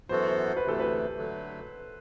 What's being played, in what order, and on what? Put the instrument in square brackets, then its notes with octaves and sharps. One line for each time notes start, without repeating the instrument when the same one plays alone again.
[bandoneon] F#2 E3 B3 F#4 A4 [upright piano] C5
[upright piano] C5
C5
B4
[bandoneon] D2 C3 E3 A3 [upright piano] A4
[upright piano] B4
[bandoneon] D3 F#3 A3